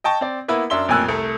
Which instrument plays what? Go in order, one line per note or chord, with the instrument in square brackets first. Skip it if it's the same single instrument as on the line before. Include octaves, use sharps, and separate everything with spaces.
[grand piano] D#5 G5 A5 C#6
C4 D5
A#3 B3 E4 B4
F#2 D4 E5 C6 G7
A1 F2 A#2 G#5 E6 F#6
C2 A3